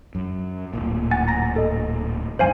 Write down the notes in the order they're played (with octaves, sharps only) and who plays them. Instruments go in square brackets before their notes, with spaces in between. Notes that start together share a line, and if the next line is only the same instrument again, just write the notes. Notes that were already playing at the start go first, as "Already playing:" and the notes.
[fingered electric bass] F#2
D1 G1 A#2
[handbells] F#5 G#5 A6
A#5 A#6
A4 D#5
[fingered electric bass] D#1 G2 D#3 [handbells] C5 F5 G#5